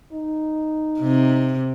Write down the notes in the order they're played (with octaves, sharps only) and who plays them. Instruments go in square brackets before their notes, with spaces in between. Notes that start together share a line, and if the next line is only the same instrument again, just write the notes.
[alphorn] D#4
[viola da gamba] C3